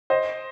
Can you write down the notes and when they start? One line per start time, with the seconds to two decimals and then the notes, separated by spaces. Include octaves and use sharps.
0.10 C5 D#5